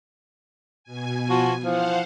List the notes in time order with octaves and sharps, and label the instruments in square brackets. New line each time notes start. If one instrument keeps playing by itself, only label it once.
[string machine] B2 G#5
[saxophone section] F3 F#4
[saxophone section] E3 F3 [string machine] C5 F5 F#5